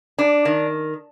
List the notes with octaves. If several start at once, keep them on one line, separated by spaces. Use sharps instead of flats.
D4
D#3